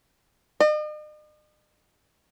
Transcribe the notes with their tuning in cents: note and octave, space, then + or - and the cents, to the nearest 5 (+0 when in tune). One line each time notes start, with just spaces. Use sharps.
D#5 -45